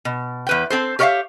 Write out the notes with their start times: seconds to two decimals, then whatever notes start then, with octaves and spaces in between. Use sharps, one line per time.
0.05 B2
0.47 E2 B4 G5
0.70 C4 A4 C5
0.99 G4 A#4 C#5 D5 E5 F5